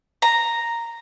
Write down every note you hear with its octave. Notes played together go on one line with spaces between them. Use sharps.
A#5